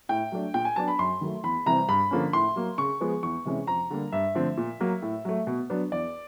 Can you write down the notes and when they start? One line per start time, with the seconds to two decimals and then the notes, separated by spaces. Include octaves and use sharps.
0.09 A2 G5
0.32 F#3 A3 D4
0.54 A#2 G5
0.65 G#5
0.76 F#3 B3 D4 A5
0.88 B5
0.99 F#2 C6
1.21 D#3 F#3 A3
1.44 E2 B5
1.66 C3 E3 G3 C4 A#5
1.89 G2 B5
2.11 D3 F3 A#3 C#4
2.33 A2 C6
2.56 F#3 A#3
2.78 C#3 C#6
3.01 F3 G#3 B3
3.23 E2 C#6
3.45 C3 E3 G#3 C#4
3.67 F2 A#5
3.90 D3 G3 A#3
4.12 G2 E5
4.35 D3 F3 A3 C4
4.57 A#2
4.80 F#3 A#3
5.02 A2
5.25 F#3 A3
5.47 B2
5.70 F#3 B3 D4
5.92 E2 D5